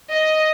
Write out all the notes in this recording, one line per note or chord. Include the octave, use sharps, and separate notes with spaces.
D#5